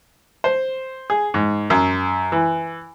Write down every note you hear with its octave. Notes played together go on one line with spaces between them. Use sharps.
C5
G#4
G#2
F#2
E3